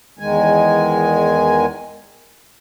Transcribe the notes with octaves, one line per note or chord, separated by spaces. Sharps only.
E2 D#3 G#3 G#5